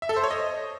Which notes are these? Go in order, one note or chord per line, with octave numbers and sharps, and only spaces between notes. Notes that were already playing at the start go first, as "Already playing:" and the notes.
E5
A4
C5
C#5
D#5